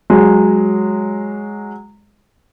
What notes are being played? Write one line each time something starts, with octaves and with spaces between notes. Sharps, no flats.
F#3 G#3